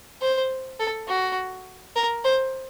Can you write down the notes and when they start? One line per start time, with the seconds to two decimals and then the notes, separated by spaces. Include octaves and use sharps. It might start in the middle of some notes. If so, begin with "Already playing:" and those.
0.22 C5
0.79 A4
1.08 F#4
1.96 A#4
2.24 C5